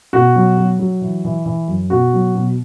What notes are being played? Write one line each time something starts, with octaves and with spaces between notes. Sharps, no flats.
B2 F#4
F#3
F#3
F#3
E3
E3
E3
F#2
B2 F#4
F#3
B2